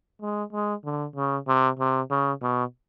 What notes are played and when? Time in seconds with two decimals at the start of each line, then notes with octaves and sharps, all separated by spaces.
0.21 G#3
0.53 G#3
0.84 D3
1.16 C#3
1.47 C3
1.79 C3
2.10 C#3
2.42 B2